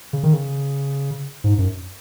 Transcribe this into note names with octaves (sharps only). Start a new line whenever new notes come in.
C#3
D#3
C#3
G#2
F#2